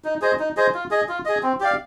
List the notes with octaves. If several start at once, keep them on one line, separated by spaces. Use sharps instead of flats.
D#4
G#4 C5 D#5
D#4
G#4 C5 D#5
F4
G#4 D#5
F4
G#4 D#5
C4
G4 D5 F5